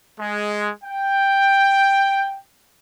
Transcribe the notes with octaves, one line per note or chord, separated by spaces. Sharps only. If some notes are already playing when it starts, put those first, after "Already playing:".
G#3
G5